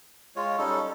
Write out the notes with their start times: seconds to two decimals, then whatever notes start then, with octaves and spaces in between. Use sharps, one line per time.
0.36 G#3 F4 C#5
0.58 G3 C#4 D#4 A4